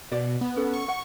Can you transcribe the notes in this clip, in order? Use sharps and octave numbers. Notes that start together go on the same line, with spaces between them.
B2 D5
B3
C#4 A4 F#5
C#6
F#5